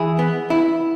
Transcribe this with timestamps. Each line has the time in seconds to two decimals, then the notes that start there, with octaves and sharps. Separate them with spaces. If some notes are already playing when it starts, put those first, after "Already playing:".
Already playing: E3 E4 G#4
0.19 B3
0.50 E4